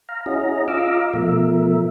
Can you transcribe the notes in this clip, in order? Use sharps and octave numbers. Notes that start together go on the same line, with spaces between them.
F5 A#5
C#4 E4 F#4 G#4 D#5 A#5
F4 D#5 F5 A#5 D6 E6
B2 F3 A3 A#4 E5